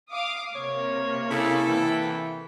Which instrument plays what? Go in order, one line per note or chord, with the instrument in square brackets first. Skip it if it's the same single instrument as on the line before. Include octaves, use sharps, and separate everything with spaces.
[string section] F5 D6 D#6
[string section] C3 A#3 [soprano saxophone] C#5
[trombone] C#3 [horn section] E4 A4
[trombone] E3 [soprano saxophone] G5